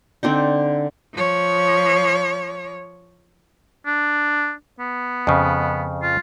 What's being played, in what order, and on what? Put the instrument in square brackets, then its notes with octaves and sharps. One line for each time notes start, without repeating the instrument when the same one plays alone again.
[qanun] D3 C4 D4 D#4
[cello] F3 C#5
[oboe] D4
B3
[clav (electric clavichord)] F2 C#3
[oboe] F4